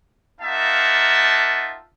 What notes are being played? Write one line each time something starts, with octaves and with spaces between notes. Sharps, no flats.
A#3 D#4 F4 E5 F#5 A5